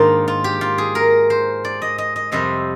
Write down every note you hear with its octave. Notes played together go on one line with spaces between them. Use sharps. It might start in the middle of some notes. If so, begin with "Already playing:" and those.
Already playing: G#2 D#3 A#3 D4 D#4 F4
F4
G4
F4
G#4
A#4
C5
D5
D#5
D#5
D#5
F2 C3 G3 C4 D#5